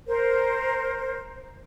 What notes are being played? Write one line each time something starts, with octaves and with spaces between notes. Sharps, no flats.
A#4 C5